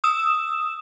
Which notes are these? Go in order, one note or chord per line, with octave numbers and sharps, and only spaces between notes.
D#6 E6 E7